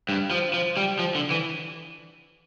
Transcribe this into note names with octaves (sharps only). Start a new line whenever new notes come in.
G2
F3
F3
G3
F3
D3
E3